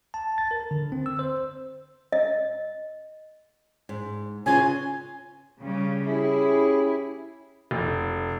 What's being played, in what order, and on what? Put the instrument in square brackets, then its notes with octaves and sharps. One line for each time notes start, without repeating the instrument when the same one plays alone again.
[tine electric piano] A5
A6
A#4
D3
C4
E6
C5
[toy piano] D#5
[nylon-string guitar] G#2
[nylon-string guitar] C#3 F4 B4 [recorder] G#5
[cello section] C#3 G3 C#4
[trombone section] C#4 G4 G#4 [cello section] E4
[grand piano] F1